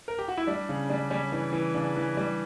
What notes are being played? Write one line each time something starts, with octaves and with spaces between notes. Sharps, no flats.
A#4
G4
F#4
E4
G3 D4
C#3 C#4
G3 D4
G3 C#4
E3 D4
E3
C#3 D4
E3
G3